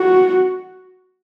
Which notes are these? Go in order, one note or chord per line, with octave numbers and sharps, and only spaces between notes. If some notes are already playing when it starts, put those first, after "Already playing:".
Already playing: F#4